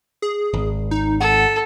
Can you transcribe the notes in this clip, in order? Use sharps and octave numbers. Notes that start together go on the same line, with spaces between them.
G#4
G#1
D#4
A4 F#5